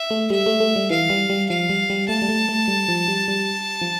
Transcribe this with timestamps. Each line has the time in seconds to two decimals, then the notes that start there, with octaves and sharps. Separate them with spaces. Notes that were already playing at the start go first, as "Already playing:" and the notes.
Already playing: E5
0.10 A3
0.30 G3 E5
0.46 A3
0.60 A3
0.76 G3
0.90 E3 F5
1.10 G3
1.29 G3
1.49 F3 F5
1.69 G3
1.90 G3
2.08 A3 A5
2.22 G3
2.29 A3
2.49 A3
2.68 G3
2.89 F3
3.08 G3
3.28 G3
3.81 F3